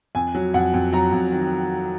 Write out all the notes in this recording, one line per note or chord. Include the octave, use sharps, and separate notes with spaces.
F2 G#5
F#3
F2 F#5
F2
F#3 A#5
F2
D#3